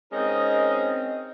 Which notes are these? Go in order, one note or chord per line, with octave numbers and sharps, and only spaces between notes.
G#3 C4 C#4 D#4 A#4 D#5